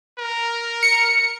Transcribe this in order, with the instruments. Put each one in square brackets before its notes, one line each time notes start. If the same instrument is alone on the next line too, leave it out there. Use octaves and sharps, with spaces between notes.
[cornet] A#4
[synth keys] C#7